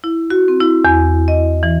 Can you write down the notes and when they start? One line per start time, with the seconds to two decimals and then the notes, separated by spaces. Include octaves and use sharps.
0.04 E4
0.30 F#4
0.48 C4
0.60 E4
0.85 E2
1.28 D#5
1.63 E3